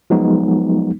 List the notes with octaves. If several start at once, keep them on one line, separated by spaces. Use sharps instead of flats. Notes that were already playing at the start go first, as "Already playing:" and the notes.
F3 F#3 G#3 B3 D#4